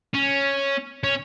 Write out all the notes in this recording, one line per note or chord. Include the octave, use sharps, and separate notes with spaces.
C#4
C#4